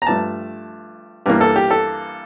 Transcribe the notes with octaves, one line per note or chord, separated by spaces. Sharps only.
A#5
G2 F3 A3 A5
G2 E3 A#3
A4
G4
A4